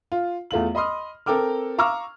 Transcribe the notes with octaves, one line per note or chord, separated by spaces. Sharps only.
F4
E2 A3 F4 F#7
D#5 B5 C6 D#6 F6
C4 A4 A#4 G5 D6 F6
F5 A#5 C#6 D6 E6 F6